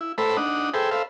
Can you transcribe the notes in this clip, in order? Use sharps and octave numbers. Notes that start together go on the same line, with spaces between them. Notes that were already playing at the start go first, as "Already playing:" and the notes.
E4
A3 A4 B4 C5 E5 B5
D4 D#4 F#5 D#6
G#4 A4 B4 C5 E5 G5
A4 B4 C5 E5 F5